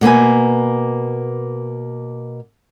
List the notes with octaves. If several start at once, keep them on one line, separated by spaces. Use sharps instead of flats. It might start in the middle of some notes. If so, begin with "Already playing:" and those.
B2 A#3 B4 G#5